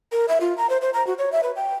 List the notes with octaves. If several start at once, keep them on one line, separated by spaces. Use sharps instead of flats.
A#4
E5
F4
A#5
C5
C5
A#5
F#4
C#5
E5
B4
G5